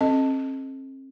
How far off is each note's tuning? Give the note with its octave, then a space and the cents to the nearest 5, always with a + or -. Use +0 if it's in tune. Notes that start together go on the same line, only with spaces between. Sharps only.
C4 +40 A4 -20 D#5 +0